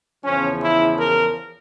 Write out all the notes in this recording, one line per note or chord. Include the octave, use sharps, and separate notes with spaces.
E2 C#3 F3 C#4
E4
A#4